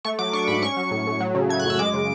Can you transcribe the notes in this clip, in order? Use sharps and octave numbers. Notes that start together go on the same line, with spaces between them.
A3 C#6
F#3 D6
D4 C#6
G#2 B5
C#4 C#6
F#3
A2
A2
F#3
C#3
A3 G#6
F#6
F#2
E6
G#3 D6
C#3